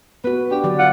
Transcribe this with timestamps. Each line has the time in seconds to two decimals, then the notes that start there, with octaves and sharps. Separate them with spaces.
0.24 B3 F#4 B4
0.51 D4 G4
0.64 D3 F#3 D5
0.79 F4 F#5